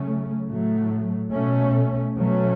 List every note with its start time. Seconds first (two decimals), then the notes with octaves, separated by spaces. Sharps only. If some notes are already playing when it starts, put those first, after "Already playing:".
Already playing: C#3 F#3 A3 C#4
0.47 A2 F#3 A3
1.31 B2 A3 C#4
2.16 B2 F#3 A3 C#4